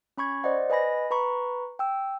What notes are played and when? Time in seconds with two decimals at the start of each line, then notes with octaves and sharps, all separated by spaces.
0.18 C#4 B5 C#6 G#6
0.44 C5 D5 D#5 F#5
0.70 B4 D#5 G#5 B5 A#6
1.11 B4 A#5 B5 C#6
1.79 G5 E6